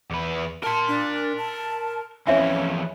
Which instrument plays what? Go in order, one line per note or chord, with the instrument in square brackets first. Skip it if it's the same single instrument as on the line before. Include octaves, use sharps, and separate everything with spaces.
[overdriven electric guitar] E2 B4
[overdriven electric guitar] A#4 C6 [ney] A5
[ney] D4
A5
[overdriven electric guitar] F2 E3 [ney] C#4 [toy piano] C#5 E5 G#5